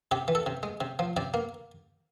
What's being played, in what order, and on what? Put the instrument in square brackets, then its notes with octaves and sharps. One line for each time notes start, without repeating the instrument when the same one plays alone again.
[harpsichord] C3 G4
E3
A4
C3
G#3
C3
F3
C3 D5
A#3